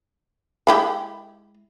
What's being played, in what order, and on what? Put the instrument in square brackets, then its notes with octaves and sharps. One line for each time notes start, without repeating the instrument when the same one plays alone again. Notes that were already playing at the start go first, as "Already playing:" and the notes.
[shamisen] G#3 E4 G4